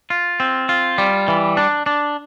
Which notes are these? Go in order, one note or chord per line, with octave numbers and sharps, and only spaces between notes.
F4
C4
F4
G3
E3
D4
D4